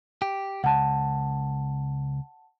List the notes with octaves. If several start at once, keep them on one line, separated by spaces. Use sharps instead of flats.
G4
C#2 F#5 A5